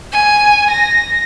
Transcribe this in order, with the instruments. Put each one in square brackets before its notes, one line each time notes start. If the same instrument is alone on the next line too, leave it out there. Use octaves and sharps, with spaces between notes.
[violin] G#5
A#6